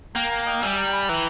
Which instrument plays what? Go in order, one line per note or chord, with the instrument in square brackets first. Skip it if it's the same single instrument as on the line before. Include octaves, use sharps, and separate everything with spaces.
[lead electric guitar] A#3 [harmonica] G5 A#5
[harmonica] G5 A#5
D#5 G5
[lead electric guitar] G3 [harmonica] E5 G#5
[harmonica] G5 A#5
G#5 B5
[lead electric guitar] E3 [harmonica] G5 A#5